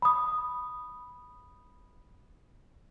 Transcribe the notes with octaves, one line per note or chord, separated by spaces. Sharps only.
B5 D#6